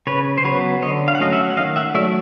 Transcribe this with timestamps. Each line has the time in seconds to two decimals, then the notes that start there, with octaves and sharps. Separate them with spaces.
0.07 C#3 B4 C#5
0.38 C5
0.44 F#3 B3 B4 C#5
0.82 D3 C#5 D#5
1.08 F5
1.15 F#5
1.20 F#3 A3 C#4 D#5 F5
1.32 E5 F#5
1.50 F#5
1.57 D#3 D#5 F5
1.76 E5 F#5
1.94 F#3 A3 D5 E5